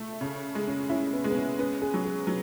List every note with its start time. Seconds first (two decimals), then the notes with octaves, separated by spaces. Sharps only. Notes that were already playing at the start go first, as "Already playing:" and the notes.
Already playing: A3
0.21 C#3
0.55 G#3
0.67 C#4
0.89 C#4 E4
1.13 B3
1.24 G#3
1.30 B3
1.36 C#4
1.59 B3 C#4
1.82 G#4
1.94 F#3
2.05 G#4
2.27 F#3